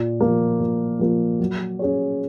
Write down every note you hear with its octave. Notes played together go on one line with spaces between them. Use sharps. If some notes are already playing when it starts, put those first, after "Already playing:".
Already playing: A#2
F3 A#3
A#2
F3 A#3
F#3
C#4 G#4 C#5